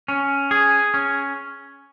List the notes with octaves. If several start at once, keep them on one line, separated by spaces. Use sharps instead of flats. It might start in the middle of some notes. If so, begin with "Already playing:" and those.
C#4
G#4
C#4